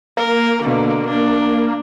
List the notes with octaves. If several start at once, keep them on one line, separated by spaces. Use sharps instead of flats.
A#3 A#4
B2 D3
D4